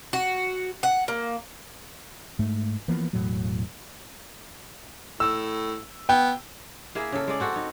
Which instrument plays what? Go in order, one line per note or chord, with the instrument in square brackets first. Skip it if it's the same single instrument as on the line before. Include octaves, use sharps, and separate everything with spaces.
[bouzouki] F#4
F#5
A#3
[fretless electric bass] G#2 A3
E3 F3 A#3 B3
E1 A2 F#3
[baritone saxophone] A2 [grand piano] E6
[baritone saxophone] B3 [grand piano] G5
[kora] A#3 E4 G#4 E5
C#3 A4
G#3 D5
C4 F#4 A4
D#4